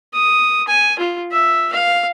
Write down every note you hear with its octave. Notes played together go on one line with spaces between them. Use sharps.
D#6
G#5
F4
E5
F5